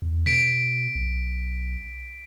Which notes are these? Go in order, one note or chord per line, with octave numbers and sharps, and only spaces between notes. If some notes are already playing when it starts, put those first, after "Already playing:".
E2
B2 B6 D7
B1